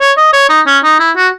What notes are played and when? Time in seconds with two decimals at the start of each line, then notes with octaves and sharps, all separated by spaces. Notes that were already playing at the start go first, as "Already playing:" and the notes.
0.01 C#5
0.18 D#5
0.33 C#5
0.49 D#4
0.67 C#4
0.84 D#4
0.99 E4
1.17 F#4